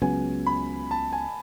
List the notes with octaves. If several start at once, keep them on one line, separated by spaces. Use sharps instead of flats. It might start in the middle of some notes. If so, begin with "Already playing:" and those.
C#2 C#3 F#3 B3 G#5
B5
A5
G#5